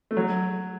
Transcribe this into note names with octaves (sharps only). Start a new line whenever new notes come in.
A3
F#3